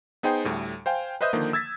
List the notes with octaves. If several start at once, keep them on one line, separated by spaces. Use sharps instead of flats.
B3 D#4 G#4 C5 G5
D2 A2 G3
C5 F5 G5 G#5
B4 C5 D#5 E5 D#6 G6
D3 D#3 F3 A#3
E6 G#6 A6 B6